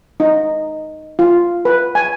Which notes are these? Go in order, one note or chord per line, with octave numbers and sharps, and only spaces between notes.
D#4
F4
B4
G#5